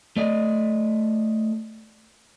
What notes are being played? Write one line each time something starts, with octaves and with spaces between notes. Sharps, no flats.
A3 D5 D#5